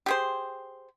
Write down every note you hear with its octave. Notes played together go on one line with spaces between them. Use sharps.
G4 G#4 C5